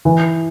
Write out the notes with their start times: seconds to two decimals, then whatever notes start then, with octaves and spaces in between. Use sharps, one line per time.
0.05 E3